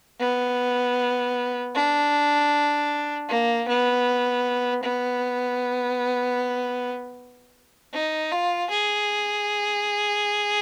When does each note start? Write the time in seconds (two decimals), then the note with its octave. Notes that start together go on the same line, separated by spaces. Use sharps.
0.20 B3
1.75 D4
3.29 A#3
3.69 B3
4.83 B3
7.93 D#4
8.32 F4
8.70 G#4